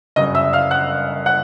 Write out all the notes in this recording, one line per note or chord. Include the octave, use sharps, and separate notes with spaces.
G1 F#2 C#3 D#5 D#6
E5 E6
F5 F6
F#5 F#6
F#5 F#6